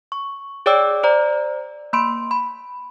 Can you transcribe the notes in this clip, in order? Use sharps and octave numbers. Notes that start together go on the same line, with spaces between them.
C#6
G#4 C#5 D5 G5 D6 E6
C5 D5 A#5
A#3 B5 C6 D7
B5